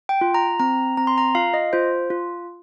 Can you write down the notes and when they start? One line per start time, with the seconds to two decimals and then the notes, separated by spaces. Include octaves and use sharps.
0.09 G5
0.21 F4
0.34 A#5
0.60 C4 A#5
0.97 C4 A#5
1.07 C6
1.18 A#5
1.35 F4 F5
1.54 D#5
1.73 F4 C5
2.10 F4